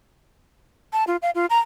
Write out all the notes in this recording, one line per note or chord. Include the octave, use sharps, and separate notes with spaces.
A5
F4
F5
F4
A#5